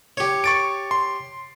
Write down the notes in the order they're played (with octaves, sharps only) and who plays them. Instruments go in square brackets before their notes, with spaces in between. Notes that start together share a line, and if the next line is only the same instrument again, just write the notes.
[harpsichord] G4 C#5
[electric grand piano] C#6 A6 D7
C6